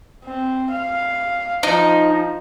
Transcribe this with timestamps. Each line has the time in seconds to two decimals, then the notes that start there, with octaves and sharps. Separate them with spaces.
0.25 C4
0.71 F5
1.63 F3 D#4